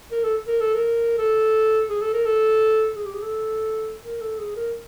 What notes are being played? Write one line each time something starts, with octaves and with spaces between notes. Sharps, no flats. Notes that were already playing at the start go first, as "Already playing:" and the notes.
A#4
A4
A#4
A4
A#4
A4
G#4
A4
A#4
A4
G#4
G4
G#4
A4
A#4
A4
G#4
A#4